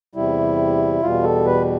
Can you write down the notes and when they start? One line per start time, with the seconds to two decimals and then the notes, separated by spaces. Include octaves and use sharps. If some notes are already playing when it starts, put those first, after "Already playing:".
0.15 E2 C3 G3 E4
1.02 E2 B2 G3 F4
1.23 A4
1.45 B4